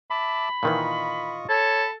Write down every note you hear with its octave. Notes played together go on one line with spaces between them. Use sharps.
E5 A5 B5 D6
A#2 D#3 E3 F4 D#5 C#6
A4 C#5 B5